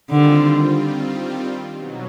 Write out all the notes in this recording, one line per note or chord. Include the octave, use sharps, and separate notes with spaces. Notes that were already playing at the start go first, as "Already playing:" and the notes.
D3 D#3 G3 C4 F4
B2 F#3